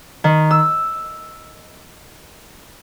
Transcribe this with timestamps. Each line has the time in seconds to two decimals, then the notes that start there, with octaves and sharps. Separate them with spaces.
0.24 D#3
0.51 E6